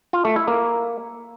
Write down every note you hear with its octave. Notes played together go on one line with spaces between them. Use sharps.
F4
A3
E4
A#3